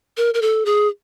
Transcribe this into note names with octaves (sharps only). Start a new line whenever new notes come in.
A#4
A#4
A4
G#4